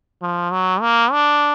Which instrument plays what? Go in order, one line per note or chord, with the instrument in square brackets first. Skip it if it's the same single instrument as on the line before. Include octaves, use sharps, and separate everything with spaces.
[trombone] F3
F#3
A#3
D4